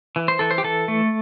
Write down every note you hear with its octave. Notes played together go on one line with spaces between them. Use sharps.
E3
C5
E3 A4
C5
G4
E3 A4
A3